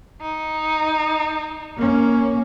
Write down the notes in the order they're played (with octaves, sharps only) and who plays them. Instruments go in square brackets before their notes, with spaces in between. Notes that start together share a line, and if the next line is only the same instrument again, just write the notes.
[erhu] D#4
[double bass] A#3 C#4